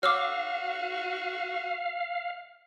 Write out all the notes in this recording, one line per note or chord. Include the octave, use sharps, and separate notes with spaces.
F#4 C#5 F5 D6 E6 F6